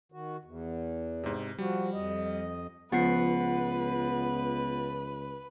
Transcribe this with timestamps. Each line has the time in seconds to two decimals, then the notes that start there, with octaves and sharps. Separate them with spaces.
0.12 D#3 F#4
0.44 E2
1.23 G#2 C3
1.59 F3 G3 F#4
1.94 F2 D#5
2.92 C#2 F3 B3 B4 F#5 C7